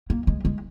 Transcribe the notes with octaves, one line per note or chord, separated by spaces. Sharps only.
A#3
G#3
G#3